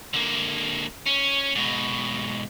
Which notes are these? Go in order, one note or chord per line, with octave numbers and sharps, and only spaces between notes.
D3 A#3
C#4
G#2 B2